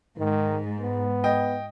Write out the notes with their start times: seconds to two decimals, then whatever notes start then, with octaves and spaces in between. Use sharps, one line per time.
0.18 G#2 D#3
0.79 B3
1.24 D#5 G5